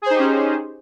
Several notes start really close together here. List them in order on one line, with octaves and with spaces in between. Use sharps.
G#4 C5 D#4 G4 C#4